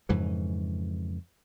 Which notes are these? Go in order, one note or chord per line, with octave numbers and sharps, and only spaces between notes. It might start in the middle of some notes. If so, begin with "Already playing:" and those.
F2 G#2 C#3 E3